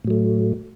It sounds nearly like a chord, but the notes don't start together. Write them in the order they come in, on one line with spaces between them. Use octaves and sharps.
A2 F#3 A3